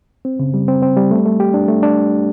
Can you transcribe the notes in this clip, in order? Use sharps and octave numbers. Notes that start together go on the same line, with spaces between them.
C4
C#3
G3
C4
C4
G3
A3
A3
G4
D4
A3
D4